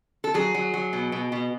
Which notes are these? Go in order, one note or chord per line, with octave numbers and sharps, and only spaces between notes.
A4
F#3 G#4
F#3
F#3
B2
B2
B2